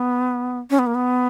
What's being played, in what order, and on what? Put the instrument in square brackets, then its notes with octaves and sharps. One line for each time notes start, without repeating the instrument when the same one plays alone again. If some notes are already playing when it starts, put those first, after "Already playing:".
Already playing: [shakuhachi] B3
C#4
B3
A#3
B3